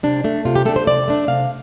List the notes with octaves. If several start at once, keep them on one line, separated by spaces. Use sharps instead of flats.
C3 D4
A3 D4
C3 F4
G4
A3 D4 A4
C5
C3 D5
A3 D4
C3 F5